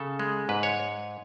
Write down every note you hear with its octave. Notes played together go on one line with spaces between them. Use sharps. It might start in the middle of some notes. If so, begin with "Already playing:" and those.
Already playing: C#3 A4
G#3
G#2 B4
C#5